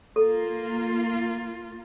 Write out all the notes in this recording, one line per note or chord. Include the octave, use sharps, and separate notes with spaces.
A#3 F4 A4